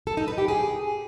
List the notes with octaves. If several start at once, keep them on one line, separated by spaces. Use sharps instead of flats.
A4
D#4
B4
G4
G#4